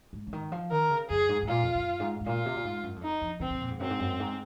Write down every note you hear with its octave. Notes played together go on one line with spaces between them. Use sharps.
G#2
C#3
D#3
F3
D#3 A#4
C#3
F#2 G#4
G#2
G#2
A#2 F4
F2
F#2
G#2
G#2
A#2 F4
C3
A#2
G#2
F#2
F2
D#4
F2
C#3 C4
C3
A#2
G#2
F#2 C4
G#2
F#2
G#2